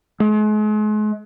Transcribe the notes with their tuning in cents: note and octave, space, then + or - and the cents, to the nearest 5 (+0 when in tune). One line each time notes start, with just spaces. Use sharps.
G#3 +40